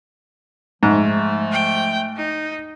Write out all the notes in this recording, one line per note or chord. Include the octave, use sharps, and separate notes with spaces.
G#2 F3 A3
G5
D#4